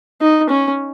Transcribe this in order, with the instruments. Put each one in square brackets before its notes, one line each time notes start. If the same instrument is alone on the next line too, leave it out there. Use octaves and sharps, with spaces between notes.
[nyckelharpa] D#4
C#4